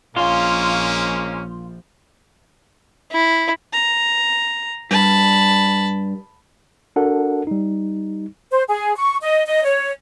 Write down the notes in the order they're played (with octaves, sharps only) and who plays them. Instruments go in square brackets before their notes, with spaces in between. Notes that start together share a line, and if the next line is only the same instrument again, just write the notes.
[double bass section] A#1 F3 [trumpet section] G#3 A#3 C#4 [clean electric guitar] F4
[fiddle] E4
[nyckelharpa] A#5
[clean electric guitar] G2 [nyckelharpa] A5 B5
[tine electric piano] D4 F#4 A4 A#4 F#5
G3 D#4
[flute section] C5
G#4
C#6
D#5
D#5
C#5